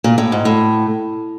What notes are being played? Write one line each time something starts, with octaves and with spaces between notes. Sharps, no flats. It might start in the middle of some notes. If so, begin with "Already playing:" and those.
A#2
A2
G#2
A2